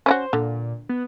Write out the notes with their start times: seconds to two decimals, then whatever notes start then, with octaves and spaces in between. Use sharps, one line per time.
0.06 C#4 E4 F#4 C5
0.33 A#2 D3
0.89 B3